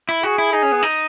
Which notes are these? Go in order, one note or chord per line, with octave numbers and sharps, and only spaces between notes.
E4
F#4 G#4
E4
D#4 G#4
C#4
B3
D#4